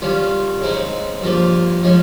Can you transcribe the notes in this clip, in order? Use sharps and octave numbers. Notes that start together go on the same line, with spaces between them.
D#3 G3 C#4 F4
C#3 G#3 C4 D#4
G2 F3 A#3
F3 G#3 C#4